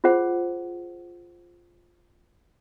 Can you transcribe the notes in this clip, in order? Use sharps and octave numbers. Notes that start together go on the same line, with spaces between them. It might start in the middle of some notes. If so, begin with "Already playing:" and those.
F4 G#4 C5 F#5